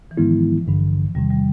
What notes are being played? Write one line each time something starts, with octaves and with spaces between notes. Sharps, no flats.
E3
G#2 D#3 F3 G#3 B3 E4
A1 G2 D3
E2 C3 D#3 G3
G3